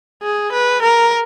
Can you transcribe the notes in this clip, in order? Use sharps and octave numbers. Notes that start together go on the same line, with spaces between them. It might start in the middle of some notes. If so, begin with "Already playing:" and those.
G#4
B4
A#4